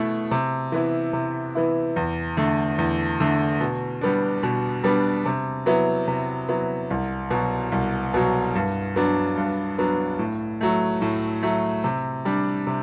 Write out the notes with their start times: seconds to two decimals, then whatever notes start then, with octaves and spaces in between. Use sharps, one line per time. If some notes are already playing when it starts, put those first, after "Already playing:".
Already playing: B2 A3 E4
0.31 C3
0.72 E3 B3 E4
1.13 C3
1.55 E3 B3 E4
1.96 E2
2.37 D3 A3
2.78 E2
3.20 D3 A3
3.60 B2
4.01 G3 B3 D4
4.43 B2
4.84 G3 B3 D4
5.26 C3
5.66 F#3 B3 E4
6.08 C3
6.49 F#3 B3 E4
6.90 C2
7.31 B2 F#3
7.72 C2
8.14 B2 F#3
8.55 G2
8.96 F#3 B3 D4
9.37 G2
9.78 F#3 B3 D4
10.19 A2
10.61 F#3 A3
11.02 A2
11.43 F#3 A3
11.84 C3
12.25 G3 D4
12.67 C3